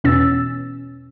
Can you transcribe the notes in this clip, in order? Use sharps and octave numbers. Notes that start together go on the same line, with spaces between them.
E2 B2 C#4 E6 A6